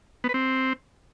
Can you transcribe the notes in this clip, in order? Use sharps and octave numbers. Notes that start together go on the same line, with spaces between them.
B3
B4
C4